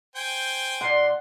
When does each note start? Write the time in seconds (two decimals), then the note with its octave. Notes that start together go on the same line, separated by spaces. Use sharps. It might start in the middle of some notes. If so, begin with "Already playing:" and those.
0.16 C5 G5 G#5
0.81 A#2 D5 F#5 C6